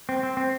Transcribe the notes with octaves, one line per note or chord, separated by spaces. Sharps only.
C4
C4
C4